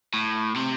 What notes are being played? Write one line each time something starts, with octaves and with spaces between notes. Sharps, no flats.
A2
C3